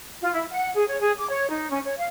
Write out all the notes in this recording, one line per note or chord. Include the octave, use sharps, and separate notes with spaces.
F4
E4
F#5
G#4
C#5
G#4
D6
C#5
D#4
C#4
C#5
F5